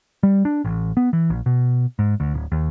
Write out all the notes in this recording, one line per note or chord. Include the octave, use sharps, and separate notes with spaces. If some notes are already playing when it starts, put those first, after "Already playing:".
G3
D4
A1
B3
E3
A#1
B2
G#2
D2
D1
D#2